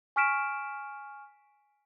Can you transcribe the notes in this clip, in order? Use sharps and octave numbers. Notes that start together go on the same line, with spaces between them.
G#5 C#6 F6 B6 D7 E7